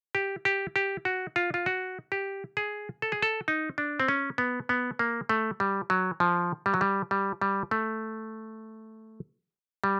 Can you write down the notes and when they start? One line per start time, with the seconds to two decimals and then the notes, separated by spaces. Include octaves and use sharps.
0.15 G4
0.45 G4
0.76 G4
1.05 F#4
1.36 F4
1.54 F4
1.66 F#4
2.12 G4
2.57 G#4
3.02 A4
3.12 G#4
3.22 A4
3.48 D#4
3.78 D4
4.00 C4
4.08 C#4
4.38 B3
4.69 B3
4.99 A#3
5.29 A3
5.60 G3
5.90 F#3
6.20 F3
6.66 G3
6.74 F#3
6.81 G3
7.11 G3
7.41 G3
7.71 A3
9.84 G3